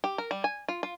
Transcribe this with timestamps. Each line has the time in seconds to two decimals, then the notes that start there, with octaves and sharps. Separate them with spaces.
0.04 G4
0.18 A#4
0.31 G3
0.44 G#5
0.68 F4
0.83 F4